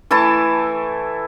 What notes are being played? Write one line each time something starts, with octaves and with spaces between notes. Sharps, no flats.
E3 A3 E4 A5